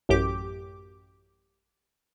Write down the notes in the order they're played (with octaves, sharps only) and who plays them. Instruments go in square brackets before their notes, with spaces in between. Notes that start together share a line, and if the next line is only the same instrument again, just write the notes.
[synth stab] A1 F#2 G4 D6